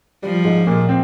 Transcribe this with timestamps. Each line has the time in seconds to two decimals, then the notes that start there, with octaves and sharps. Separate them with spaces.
0.23 F3 G3
0.45 G#2 G#3
0.67 A#2 A#3
0.89 C4